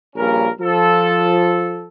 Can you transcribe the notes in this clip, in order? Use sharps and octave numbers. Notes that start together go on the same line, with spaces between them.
A#1 G2 A#3 C#4 A#4
F3 A4